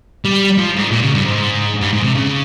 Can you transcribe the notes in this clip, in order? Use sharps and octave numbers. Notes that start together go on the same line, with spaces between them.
G3
F3
G#2
A#2
C#3
G2
G#2
G2
G#2
C3
C#3